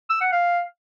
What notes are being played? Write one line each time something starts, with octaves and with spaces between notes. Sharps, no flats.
E6
F#5
F5